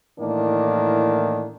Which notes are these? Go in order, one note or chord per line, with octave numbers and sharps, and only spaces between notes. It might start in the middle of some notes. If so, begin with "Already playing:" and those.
A2 D#3 E3 A#3 D4